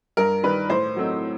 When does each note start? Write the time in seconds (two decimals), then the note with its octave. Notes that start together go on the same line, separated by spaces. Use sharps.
0.17 G2 A#4
0.43 D#3 G3 B4
0.70 A2 C5
0.96 F#3 A3 C4 D#4